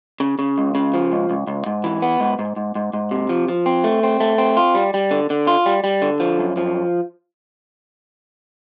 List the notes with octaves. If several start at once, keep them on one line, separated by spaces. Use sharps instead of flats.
C#3
C#3
C#2
C#3
F3
C#2
C#2
C#2
G#2
E3
B3
G#2
G#2
G#2
G#2
G#2
C3
F3
F3
C4
A3
C4
A3
C4
F4
G3
G3
D3
D3
F4
G3
G3
D3
F3
F#2
F3